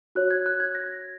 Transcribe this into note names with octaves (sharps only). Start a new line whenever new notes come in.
F#4 C#5 F#6
G#6
F#6
G#6
A#6